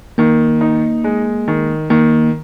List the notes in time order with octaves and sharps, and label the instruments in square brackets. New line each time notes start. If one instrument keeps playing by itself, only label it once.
[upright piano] D#3 [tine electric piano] A#3
[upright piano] D#4
G#3
D#3
[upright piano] D#3 [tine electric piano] A#3